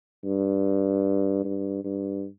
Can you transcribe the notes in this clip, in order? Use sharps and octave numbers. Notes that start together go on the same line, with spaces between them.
G2
G2
G2